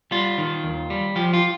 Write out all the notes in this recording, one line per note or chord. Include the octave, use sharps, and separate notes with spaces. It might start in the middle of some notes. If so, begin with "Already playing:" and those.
G3 F4
D#3
D#2
G3
F3 G4
F4